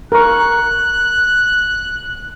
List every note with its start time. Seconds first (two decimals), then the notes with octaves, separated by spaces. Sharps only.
0.12 A#4 C#6 F#6